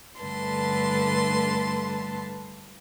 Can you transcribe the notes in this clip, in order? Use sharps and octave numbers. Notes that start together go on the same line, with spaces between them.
G2 D3 A3 B4 A5 C6